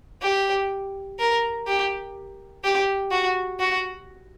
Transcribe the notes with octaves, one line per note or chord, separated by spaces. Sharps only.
G4
A#4
G4
G4
F#4
F#4